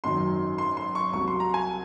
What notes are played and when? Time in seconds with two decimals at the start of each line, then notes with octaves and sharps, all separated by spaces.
0.04 G#1 F#2 D#3 F#3 C6
0.58 C6
0.77 C6
0.95 C#6
1.13 C2 C3 F#3 C#6
1.28 C6
1.40 A#5
1.54 G#5